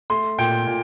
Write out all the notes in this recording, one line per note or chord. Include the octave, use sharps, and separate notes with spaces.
A3 C6
A#2 G5
A#2